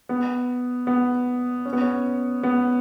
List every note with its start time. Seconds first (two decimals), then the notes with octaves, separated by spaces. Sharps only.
0.09 B3
0.87 B3
1.65 C#4
1.73 B3
1.81 C#4
2.43 B3